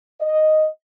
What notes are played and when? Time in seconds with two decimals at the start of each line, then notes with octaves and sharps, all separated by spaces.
0.21 D#5